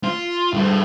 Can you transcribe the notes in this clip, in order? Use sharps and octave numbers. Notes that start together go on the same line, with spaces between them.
F4
G2 A3